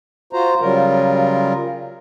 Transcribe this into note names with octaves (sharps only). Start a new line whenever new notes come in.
F4 F#4 C5 A#5
C#3 F#3 G3 F4 A#4